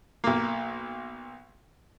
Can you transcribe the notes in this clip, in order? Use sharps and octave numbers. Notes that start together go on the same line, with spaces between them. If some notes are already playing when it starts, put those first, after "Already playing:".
B1 A#3